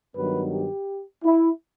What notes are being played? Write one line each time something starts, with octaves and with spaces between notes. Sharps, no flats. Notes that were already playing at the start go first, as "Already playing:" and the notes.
G2 D#3 F#3 B3 B4
G4
E4